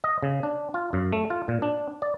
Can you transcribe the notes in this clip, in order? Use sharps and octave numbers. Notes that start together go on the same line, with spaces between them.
D#5
C#3
D4
F4
F#2
A3
F4
A#2
D4
D5